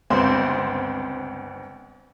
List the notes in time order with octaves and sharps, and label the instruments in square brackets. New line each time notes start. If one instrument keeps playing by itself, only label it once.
[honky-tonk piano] G1 C#2 B3 C4 C5 C6